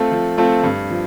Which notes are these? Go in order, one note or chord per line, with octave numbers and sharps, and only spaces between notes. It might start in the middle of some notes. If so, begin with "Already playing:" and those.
Already playing: A3 C4 F4 A4
F3
A3 C4 F4 A4
G2
F3